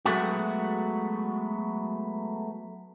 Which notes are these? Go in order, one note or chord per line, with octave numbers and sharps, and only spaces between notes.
F#3 G#3 A3 B3 F#4